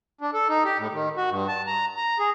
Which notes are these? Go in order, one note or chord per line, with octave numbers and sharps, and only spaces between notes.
D4
A4
D#4
G4
A2
D#3
F#4
G2
A5
A#5
A#5
G#4